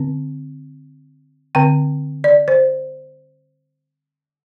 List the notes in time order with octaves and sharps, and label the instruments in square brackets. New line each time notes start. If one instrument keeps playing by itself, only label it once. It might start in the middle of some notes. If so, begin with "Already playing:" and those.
Already playing: [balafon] D3 C4
D3 C4 G5
D5
C5